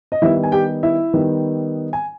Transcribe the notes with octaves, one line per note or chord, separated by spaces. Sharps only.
D#5
D#3 G3 B3 D#4 E4 E5
G#5
G4 G5
E4 E5
D#3 G3 B3 D#4
G#5